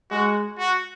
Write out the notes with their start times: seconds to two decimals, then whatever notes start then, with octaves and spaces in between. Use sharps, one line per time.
0.11 G#3 F#4
0.58 F#4